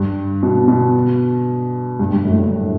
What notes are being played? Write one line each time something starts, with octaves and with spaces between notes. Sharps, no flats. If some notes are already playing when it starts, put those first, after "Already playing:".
Already playing: G2
B2
B2
G2
G2
F#2
A2
G2